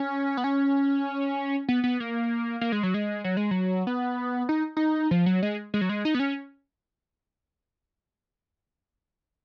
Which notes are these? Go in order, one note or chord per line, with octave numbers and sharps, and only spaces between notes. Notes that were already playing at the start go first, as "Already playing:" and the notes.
Already playing: C#4
B3
C#4
B3
B3
A#3
A#3
G#3
F#3
G#3
F#3
G#3
F#3
B3
D#4
D#4
F3
F#3
G#3
G#3
F#3
G#3
D#4
B3
C#4